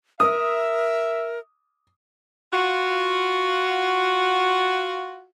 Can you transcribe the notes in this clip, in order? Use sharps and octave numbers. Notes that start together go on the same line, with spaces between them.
A#4 E5 D#6
F4 F#4